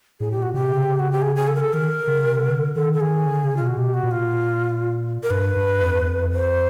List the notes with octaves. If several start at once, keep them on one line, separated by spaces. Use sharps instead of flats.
A2 G#4
G4
A#2
F#4
C3 G4
C#3
F#4
G4
G#4
G#4
A4
A#4
A4
D#3 A#4
C#3
C3
D3
D#3 A4
A4
D#3 G#4
D3
C#3
B2 F4
F#4
B2 G4
F#4
A#2
F4
A#4
G2 B4
G2
F2
E2
F2
C5